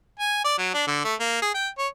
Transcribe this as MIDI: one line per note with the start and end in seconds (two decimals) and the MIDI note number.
0.19 0.44 80
0.45 0.58 74
0.59 0.72 54
0.74 0.86 62
0.87 1.02 50
1.05 1.15 57
1.20 1.40 58
1.42 1.52 68
1.54 1.69 79
1.79 1.88 73